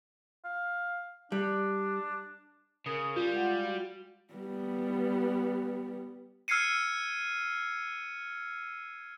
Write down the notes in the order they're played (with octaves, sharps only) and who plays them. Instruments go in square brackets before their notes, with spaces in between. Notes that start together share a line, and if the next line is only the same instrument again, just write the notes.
[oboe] F5
[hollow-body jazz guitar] G3 [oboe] D4
[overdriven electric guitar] C#3 [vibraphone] A#4 [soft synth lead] D#6
[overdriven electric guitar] G3 [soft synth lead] F4
[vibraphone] G#3 F#5
F#4
[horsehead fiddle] G3 B3
[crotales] E6 F6 G#6 C7 C#7 D#7